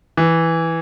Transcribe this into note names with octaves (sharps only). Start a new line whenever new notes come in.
E3